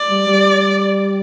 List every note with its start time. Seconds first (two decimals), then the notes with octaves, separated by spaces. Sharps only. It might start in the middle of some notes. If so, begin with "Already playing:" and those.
Already playing: D5
0.10 G3
0.27 G3